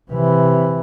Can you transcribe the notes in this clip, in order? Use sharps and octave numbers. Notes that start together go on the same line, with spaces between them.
C3 E3